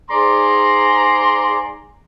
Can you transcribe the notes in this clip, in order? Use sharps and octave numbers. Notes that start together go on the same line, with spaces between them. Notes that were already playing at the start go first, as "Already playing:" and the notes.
G#2 G#4 D5 A#5 C6